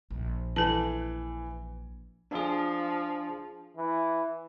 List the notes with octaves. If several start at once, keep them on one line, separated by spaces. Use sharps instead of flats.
A#1
E3 A4 A5
F3 D4 G#4
E3